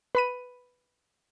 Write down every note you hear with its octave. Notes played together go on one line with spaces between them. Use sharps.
B4 B5 D#7